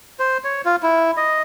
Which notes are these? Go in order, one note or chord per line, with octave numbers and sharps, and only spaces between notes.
C5
C#5
F4
E4
D#5